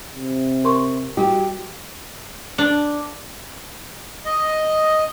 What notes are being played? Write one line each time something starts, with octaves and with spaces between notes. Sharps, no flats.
C3
A#4 C6 C#6
G3 F#4 G4
D4
D#5